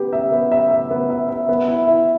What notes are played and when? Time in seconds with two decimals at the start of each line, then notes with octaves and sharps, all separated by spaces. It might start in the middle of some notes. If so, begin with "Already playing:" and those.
Already playing: B3 G4 B4
0.13 E5
0.32 B3
0.52 E5
0.71 E5
0.91 B3
1.10 E5
1.29 E5
1.49 B3
1.68 E4
1.88 E4